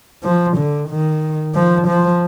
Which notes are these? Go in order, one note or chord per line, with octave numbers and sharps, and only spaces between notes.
F3
D3
D#3
F3
F3